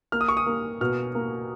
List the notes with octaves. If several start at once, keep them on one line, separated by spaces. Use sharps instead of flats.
A#3 F6
D#6
C#6
D#6
A#3
B2 F6
A#3